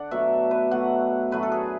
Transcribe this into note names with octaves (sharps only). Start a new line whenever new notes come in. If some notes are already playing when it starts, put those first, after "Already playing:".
Already playing: D3 D4 D5 F#5
B2 F#3 A3 E5
B4
B2 F#3 A3 F#5
A2 F#3 A3 B4
A4
G#4